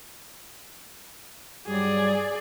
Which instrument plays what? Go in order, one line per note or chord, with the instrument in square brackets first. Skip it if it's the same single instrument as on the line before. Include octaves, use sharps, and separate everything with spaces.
[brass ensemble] G2 F#3 G3 [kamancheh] G#4 D5